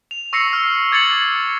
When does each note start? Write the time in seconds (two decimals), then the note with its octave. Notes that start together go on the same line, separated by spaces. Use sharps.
0.11 F7
0.33 C#6 E6 A#6 C7 C#7
0.53 F6
0.92 D6 G#6 A6 C#7 F#7